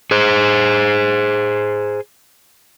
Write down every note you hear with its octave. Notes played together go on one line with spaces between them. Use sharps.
G#4 C5